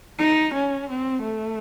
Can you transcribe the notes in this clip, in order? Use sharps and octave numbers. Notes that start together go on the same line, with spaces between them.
D#4
C#4
C4
A3